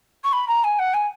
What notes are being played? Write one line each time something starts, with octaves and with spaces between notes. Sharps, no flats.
C#6
B5
A#5
G#5
F#5
G#5